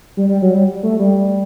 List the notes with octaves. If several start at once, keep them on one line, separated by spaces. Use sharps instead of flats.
G3
G3
F#3
G3
A3
G3